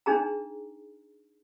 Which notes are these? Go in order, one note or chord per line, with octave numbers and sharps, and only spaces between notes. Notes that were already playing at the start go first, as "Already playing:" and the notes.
D4 D#4 G#4 A#5